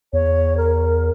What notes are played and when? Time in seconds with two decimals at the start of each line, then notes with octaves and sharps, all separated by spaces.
0.13 E2 C#5
0.57 A#4